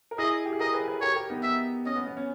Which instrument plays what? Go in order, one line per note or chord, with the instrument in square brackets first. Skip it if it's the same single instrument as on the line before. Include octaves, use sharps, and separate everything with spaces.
[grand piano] A#4
[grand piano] E4 G#4 [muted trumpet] D#5
[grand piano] G4
G#4
[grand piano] G4 A#4 [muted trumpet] D#5
[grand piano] G#4 B4
G#4 B4
[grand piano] G4 A#4 [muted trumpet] C#5
[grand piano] G4 A#4
B3 D#4
[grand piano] B3 [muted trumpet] E5
[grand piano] C#4 [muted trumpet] D#5
[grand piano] B3
B3
C#4